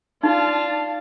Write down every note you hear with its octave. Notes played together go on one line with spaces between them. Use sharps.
D#4 F4 D5 F5 A5